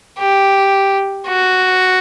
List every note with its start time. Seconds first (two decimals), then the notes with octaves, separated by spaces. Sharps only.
0.19 G4
1.28 F#4